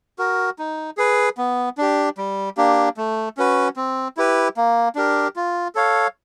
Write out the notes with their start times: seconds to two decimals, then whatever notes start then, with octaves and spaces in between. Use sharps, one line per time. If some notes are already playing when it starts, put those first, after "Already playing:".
0.19 F#4 A#4
0.59 D#4
0.97 G#4 B4
1.38 B3
1.78 D4 G4
2.18 G3
2.57 A#3 D4 G4
2.97 A3
3.37 C#4 F#4 B4
3.76 C4
4.17 E4 G4 B4
4.57 A#3
4.95 D4 G4 A#4
5.36 F4
5.75 A4 C#5 F5